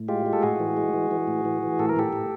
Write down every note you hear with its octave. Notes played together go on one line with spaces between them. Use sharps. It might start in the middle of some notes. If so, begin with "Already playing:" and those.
Already playing: A2
G#3 F4 G4
G#3
A4
A2 F#4 G#4
E3
G#3
E3
E3
A2
E3
E3
A2 A4
A#4
A2 G4 A4
A2